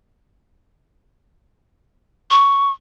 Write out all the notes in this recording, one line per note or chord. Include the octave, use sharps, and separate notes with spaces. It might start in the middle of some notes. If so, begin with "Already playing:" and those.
C#6